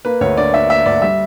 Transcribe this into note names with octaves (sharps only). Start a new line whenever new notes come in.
A#3 B4
D2 C#5
D3 D5
D4 E5
A#3 E5
D2 D5
G3 E5